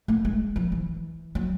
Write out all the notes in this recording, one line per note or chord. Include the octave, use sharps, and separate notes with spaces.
A3
G#3
F3
E3
F#3